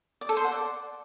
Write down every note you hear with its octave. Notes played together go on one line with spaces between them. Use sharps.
D5
A4
C5
F#5
D5